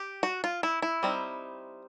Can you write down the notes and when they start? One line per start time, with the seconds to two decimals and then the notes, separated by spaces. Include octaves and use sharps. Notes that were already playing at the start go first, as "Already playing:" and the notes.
Already playing: G4
0.23 F#4
0.44 F4
0.63 E4
0.82 E4
1.03 G3 C4 D#4